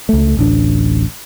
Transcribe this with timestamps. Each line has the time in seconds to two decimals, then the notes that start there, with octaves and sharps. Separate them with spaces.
0.09 C#2 A3
0.37 D1 A1 D4